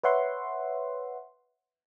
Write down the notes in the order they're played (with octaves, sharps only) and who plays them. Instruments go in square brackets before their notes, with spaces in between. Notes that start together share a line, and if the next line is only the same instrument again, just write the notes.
[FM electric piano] B4 C#5 E5 F#5 C6